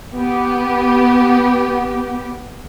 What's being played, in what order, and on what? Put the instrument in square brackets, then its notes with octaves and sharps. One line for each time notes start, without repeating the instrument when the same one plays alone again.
[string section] B3 G4